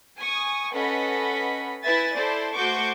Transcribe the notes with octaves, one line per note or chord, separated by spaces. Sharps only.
G#5 C#6 D#6
C#4 A4 B4 D#5 F#5 B5
E4 B4 E5 G#5 A6
E4 A4 C5 D5
A3 F#4 C5 C#6 D6 G6